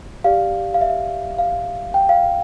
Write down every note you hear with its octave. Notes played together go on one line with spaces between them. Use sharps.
G4 D5 F5
F5
E5
F5
G5
F5